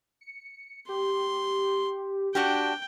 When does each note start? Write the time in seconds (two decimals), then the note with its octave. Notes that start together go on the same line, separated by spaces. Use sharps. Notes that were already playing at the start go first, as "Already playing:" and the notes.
0.21 C#7
0.89 G4 C6
2.35 D4 F#4 G4 G5